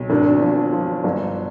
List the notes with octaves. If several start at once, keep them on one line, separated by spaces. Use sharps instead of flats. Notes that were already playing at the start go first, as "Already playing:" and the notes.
Already playing: B1
G#1 D4
F3
F3
G1